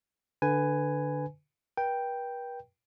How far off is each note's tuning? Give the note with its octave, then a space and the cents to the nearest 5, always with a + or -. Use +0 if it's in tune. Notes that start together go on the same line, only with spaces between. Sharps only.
D3 +0 B4 +15 G#5 +0
B4 -45 G5 +0